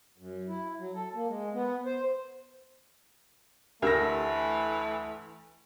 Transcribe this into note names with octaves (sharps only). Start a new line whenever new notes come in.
F#2
E4
F#3
A4
A#3
G#3
B3
C5
D2 E3 A3 G4 A#4 E6 A#6